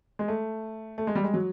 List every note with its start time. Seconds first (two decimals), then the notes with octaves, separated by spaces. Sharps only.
0.19 G#3
0.28 A3
0.98 A3
1.07 G#3
1.15 G3
1.24 G#3
1.34 F#3